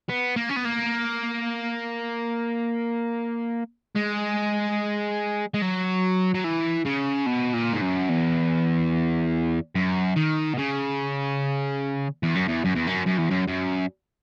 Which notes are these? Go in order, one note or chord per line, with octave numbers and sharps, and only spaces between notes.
B3
A#3
C#4
B3
A#3
G#3
G#3
F#3
F#3
E3
C#3
B2
A#2
G#2
F#2
E2
F#2
D#3
B2
C#3
E2
F#2
E2
F#2
E2
F#2
F#2
E2
F#2
F#2